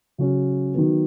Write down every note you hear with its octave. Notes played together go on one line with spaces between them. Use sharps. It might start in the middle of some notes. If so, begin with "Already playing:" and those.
C#3 F#3 C#4
D#3 F#3 B3